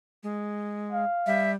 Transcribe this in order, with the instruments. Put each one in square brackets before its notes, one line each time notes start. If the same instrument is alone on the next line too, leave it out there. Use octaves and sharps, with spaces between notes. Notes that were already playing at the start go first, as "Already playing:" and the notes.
[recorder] G#3
[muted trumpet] F5
[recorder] G3 [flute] E5